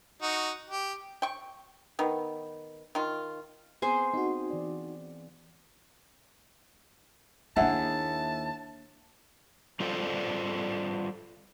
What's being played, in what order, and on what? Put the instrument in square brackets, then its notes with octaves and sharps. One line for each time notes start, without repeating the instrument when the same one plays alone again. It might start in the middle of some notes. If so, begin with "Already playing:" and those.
[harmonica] D#4 F#4
G4
[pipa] G5 C#6
D#3 B3
D#3 F4
[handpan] B3 C4 [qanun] G#4 C5 G#5
[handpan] C4 [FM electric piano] D#4 F#4
[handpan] E3 D5
[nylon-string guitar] D#2 E4 G#4 [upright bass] A#3 D4 [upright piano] E5 F#5 [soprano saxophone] A5
[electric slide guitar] G3 F4 A4 C5 D5